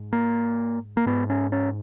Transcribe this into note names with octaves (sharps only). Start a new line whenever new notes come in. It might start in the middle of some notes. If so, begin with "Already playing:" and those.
Already playing: G#2
A#3
A#3
G#2 B3
C#4
C#4